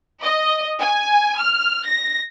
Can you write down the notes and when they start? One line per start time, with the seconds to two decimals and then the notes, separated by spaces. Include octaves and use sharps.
0.22 D#5
0.80 G#5
1.39 F6
1.85 A#6